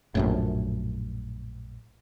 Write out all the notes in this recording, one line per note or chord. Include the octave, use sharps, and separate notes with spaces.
A#1 F#2 A2